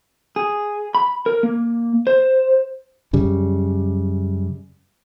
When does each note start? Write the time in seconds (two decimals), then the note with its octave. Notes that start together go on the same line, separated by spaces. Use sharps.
0.36 G#4
0.95 B5
1.26 A#4
1.43 A#3
2.07 C5
3.13 F#2 C#3 G3